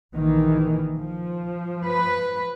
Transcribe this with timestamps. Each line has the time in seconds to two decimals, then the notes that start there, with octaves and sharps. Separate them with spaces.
0.15 A#1 D#3 E3
0.96 F3
1.84 B4